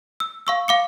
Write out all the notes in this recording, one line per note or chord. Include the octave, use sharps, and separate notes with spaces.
E6
F5 C#6 E6
F5 D6 C#7